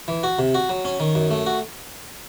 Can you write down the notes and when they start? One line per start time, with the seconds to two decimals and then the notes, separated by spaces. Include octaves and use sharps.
0.08 E3
0.23 F#4
0.39 C3
0.54 F#4
0.69 F#3
0.85 C#4
1.00 D#3
1.15 F#2
1.30 A3
1.46 F#4